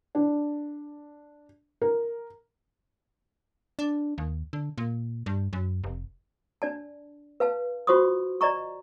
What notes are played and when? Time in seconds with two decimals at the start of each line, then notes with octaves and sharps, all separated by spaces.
0.15 D4
1.82 A#4
3.79 D4
4.18 D#2
4.53 D3
4.78 A#2
5.26 G2
5.53 F#2
5.84 F1
6.62 D4 D5 A5
7.40 B4 F5 A5
7.87 F4 F#4 C5 C6 C#6 D#6
8.41 D5 D#5 A#5 C#6